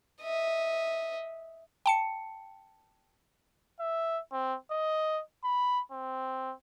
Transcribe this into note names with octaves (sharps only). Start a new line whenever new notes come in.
D#5 E5
G5 A5 C#7
E5
C4
D#5
B5
C4